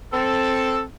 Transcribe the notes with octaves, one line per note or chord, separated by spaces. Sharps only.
C4 A4